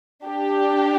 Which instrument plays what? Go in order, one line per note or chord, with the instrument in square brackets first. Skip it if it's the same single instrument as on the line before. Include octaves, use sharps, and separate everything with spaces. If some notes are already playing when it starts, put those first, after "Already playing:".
[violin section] D4 G4